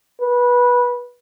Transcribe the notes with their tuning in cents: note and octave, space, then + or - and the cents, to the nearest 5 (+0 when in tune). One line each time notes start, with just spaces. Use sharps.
B4 -15